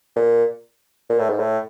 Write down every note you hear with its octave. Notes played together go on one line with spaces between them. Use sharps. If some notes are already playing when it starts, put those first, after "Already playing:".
A#2
A#2
A2
G#2
A2